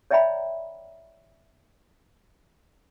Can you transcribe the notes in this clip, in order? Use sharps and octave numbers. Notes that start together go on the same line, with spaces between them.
C#5 D5 E5 G5 A#5 B5